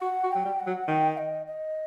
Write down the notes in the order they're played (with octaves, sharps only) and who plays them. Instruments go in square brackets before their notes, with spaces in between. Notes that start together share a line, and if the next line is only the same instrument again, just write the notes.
[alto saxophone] F#4 [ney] F#5
[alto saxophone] F#4
[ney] G5
[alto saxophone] F#3
G3
[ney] F#5
[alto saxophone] F#3
[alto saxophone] D#3 [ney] G5
[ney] D#5
D#5